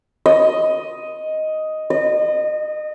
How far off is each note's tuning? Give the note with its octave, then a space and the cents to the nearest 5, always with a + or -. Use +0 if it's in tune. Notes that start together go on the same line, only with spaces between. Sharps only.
D#5 +5
D#5 -30